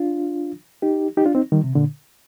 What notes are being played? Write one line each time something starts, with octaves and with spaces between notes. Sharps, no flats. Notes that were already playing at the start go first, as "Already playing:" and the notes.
Already playing: D4 F4
D#4 G4
D#4 G4
D4 F4
C4 D#4
D#3 G3
C3
A#2 D3